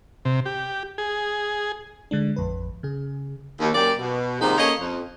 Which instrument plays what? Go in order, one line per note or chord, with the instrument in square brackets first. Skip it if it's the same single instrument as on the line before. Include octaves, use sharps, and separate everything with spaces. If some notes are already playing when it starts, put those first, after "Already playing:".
[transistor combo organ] C3
G4
G#4
[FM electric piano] D3 G#3 D4
A1 F2 B4
C#3 G#4
[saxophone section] D#2
F#2 A#3 G4 D5
B2
D#2 G#2 C3 F3 C4 D#4
A#3 C#4 A4 C#5 D#5
F2